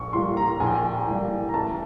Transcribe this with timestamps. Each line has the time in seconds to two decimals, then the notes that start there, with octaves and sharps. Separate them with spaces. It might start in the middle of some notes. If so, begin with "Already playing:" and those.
Already playing: A#1 C#6
0.13 A2 E3 G3 A#3 C6
0.37 A#5
0.60 A#1 G#5
0.67 G5
0.74 G#5
1.07 A2 E3 G3 A#3
1.49 A#5
1.53 A1 A5